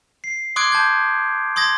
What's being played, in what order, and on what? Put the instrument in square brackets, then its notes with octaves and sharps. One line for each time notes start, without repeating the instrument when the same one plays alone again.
[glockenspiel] C7
C6 D6 D#6 F#6 G#6 D7
A5 G6 G#6
C6 D#6 G#6 A#6